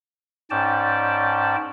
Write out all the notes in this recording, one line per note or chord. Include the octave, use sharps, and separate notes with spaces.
G#2 C#4 D5 G5 A5